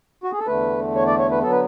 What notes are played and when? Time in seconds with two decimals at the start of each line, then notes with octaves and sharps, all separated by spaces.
0.24 F#4
0.32 G#4
0.39 A4
0.47 E2 D3 A3 B4
0.95 C#5
1.07 D5
1.19 C#5
1.31 B4
1.42 D3 F#3 B3 A4
1.52 B4